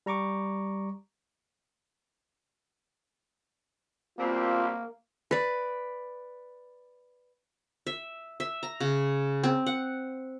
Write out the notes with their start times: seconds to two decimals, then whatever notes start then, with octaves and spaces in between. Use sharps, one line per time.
0.06 G3 A#5 C#6 D6
4.19 B2 G3 A#3 C4 F4
5.31 B4 D5
7.87 E5
8.40 E5
8.63 A#5
8.81 C#3
9.44 C4
9.66 F#5